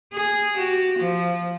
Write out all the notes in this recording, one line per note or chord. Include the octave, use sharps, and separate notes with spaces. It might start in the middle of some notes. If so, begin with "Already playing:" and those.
G#4
F#4 G4
F3